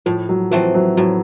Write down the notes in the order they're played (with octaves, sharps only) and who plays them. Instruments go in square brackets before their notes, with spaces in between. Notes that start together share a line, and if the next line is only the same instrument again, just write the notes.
[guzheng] A2 [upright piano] F3
[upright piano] F#3
[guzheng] E3 A3 C4 [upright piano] F3
[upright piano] F#3
[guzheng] A2 [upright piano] F#3